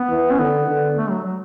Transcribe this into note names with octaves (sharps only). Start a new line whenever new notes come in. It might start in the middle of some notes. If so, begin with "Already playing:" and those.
Already playing: B3
E3
C#4
D3 B3
D3
A3
F#3
F#3